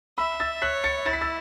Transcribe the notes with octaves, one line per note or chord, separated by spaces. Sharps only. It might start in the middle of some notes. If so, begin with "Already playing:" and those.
E5 B5 E6
E6 A6
C#5 F#6 B6
A6 C#7
E4 A6
B6
E6 A6